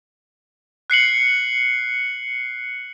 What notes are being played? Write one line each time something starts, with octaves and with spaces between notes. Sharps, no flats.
F#6 C7 C#7 F#7